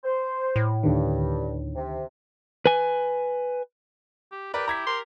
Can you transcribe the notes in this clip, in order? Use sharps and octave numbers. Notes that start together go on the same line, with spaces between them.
C5
A2
D2 G2 D3 D#3
C3
B4 G#5
G4
G4 A#4 B4 D5 A#5
E4 A#5 G#6 B6
A#4 C6